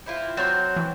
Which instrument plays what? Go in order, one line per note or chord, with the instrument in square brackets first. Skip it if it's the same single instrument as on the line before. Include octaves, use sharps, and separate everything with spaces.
[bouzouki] C4 E4 F4
[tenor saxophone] F#3 [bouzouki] C4 C5 C#5 [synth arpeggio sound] C6 F6 A6
[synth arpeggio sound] E3